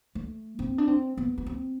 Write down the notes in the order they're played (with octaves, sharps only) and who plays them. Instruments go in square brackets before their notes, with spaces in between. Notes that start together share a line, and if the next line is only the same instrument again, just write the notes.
[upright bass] A3
C4
D4
C4
B3
B3
C4